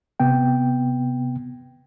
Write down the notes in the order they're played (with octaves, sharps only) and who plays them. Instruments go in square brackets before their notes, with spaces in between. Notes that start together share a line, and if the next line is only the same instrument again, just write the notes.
[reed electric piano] C3 B3 G5